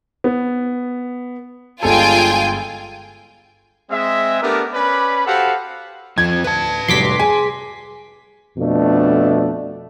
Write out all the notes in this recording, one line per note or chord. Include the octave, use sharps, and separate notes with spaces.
B3
G1 G#3 F4 A4 G5 G#5
G#3 C4 E5
A3 B3 D4 G4 A#4
C#4 B4 D5 B5
F#4 G4 A4 C5 F5 F#5
F2 F3 G#6
D2 B4 A5
F1 F#3 G3 C6 D6 B6
G#4 G#5
F2 B2 A3 D4